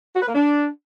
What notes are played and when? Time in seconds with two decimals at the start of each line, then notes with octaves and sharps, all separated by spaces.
0.16 F#4
0.22 B4
0.28 A#3
0.35 D4